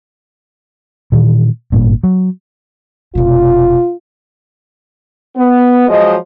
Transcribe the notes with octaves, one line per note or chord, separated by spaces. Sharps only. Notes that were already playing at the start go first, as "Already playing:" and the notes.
A#2 D#3 E3
G#1 G2 A#2
F#3
F1 B2 F4
B3
F3 F#3 G#3 D#5